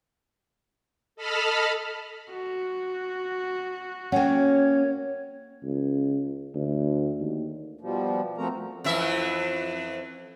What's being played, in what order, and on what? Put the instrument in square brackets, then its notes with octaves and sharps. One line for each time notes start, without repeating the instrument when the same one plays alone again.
[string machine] A4 D#5 A5 B5 F6
[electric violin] F#4
[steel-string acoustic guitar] A#3 C#4 [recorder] C#5 [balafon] F#5 G5
[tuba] C#2
D2
D#2
[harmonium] B2 F3 G3
F3 A3 C4 F#4 A#4 A#5
[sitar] F2 E3 E5